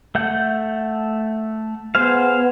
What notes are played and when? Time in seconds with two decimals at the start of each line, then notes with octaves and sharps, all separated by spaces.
0.15 A3 F#5 G6
1.95 B3 G#4 C5 F5